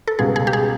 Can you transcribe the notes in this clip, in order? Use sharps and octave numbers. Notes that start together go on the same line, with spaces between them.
A4
C#2 B2 G3 B3 G#4
G#4
G4
G#4